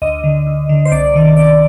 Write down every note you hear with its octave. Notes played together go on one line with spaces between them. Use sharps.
D2 D#5
D3
D2
D3
C5
C2 D5
C3 D#3
C2 D5